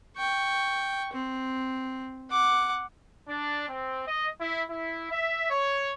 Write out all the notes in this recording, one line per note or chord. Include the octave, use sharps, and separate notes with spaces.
G5 C#6
C4
F#5 D6
D4
C4
D#5
E4
E4
E5
C#5